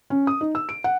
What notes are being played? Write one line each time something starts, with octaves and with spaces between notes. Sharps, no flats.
C#4
D#6
D#4
E6
D7
F#5